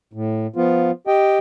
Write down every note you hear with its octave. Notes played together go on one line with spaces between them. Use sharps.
A2
F3 B3 F4
G4 D#5 G5